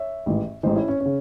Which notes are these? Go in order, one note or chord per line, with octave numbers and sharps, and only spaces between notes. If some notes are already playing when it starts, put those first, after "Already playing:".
Already playing: C#5 E5
A1 G#2 E3
A1 G#2 E3 C5 D#5
C#4 E4
C#4
C#3 C#4